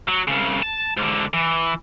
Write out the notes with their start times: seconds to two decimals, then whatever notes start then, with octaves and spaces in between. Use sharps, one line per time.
0.08 F#3
0.28 C2 C#3
0.63 A5
0.97 G#2 D3
1.33 E3